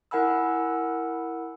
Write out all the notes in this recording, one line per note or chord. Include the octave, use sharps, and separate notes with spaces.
E4 A#4 F#5 G#5 B5 E6